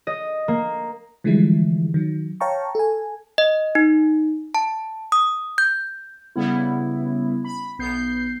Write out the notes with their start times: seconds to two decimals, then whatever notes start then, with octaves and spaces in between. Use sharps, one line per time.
0.07 D#5
0.48 A#3
1.24 D3 E3 F3 G3 G#3 E4
1.94 D#3 F#3
2.40 C#5 F5 G5 A5 A#5 C#6
2.75 A4 G#5
3.38 D#5
3.75 D#4
4.55 A5
5.12 D#6
5.58 G6
6.36 C#3 G3 B3 E4
7.45 B5
7.79 B1 B3 G6 C7